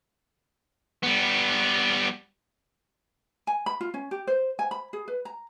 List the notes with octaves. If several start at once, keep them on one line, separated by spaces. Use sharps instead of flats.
G3 B3
G#5
B5
F4
C#4
G4
C5
G#5
B5
G#4
B4
A#5